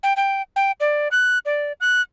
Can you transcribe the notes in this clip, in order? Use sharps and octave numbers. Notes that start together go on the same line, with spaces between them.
G5
G5
G5
D5
F#6
D5
F#6